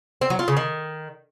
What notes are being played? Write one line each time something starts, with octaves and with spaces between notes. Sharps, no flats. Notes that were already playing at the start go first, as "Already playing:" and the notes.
C4
F#3
F4
C#3
D#3